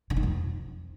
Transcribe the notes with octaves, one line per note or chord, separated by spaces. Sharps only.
D3
D#3
F2